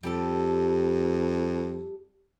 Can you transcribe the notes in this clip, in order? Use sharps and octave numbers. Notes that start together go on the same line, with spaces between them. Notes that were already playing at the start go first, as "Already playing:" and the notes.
F2 G3 G4 A4